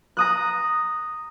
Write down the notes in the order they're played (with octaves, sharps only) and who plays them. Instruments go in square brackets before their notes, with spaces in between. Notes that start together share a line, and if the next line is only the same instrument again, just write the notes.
[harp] A#5 D#6 F#6